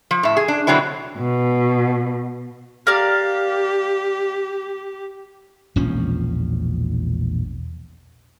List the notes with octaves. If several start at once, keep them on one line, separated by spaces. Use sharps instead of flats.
F3
A2 E5
G#4
D4
B2 D3 F#3 C4 E4
B2
G4 A#4 D5 F5
E1 A#1 F3 C#4